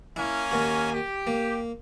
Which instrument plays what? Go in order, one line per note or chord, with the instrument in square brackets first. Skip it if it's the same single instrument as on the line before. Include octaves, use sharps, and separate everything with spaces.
[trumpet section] A#3 C#4 G#5 [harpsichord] E4
[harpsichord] D#2 F#4
[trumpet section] G4
[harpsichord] A#3